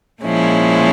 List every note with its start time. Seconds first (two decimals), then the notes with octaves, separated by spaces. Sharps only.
0.23 A#2 F3 G#3 C#4 E4